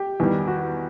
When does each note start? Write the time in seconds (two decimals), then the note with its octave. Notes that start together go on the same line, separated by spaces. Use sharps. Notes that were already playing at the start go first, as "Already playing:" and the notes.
Already playing: G4
0.20 E2 D#3 G3
0.48 F#4